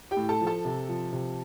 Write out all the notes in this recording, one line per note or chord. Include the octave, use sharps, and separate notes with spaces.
G4 G5
A2
A4 A5
F3
A4 A5
C3
F3
C3